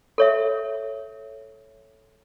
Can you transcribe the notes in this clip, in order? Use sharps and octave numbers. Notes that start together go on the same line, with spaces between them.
A4 C#5 E5